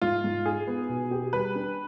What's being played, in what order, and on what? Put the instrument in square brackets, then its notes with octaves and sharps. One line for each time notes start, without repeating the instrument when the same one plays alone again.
[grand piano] G#2 [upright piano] F4
[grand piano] G#2
[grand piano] D#4 [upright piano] G#4
[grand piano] B3
B2
G4
[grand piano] G3 [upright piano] B4
[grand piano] D4